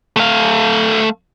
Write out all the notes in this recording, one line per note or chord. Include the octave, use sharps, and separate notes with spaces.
A3 F5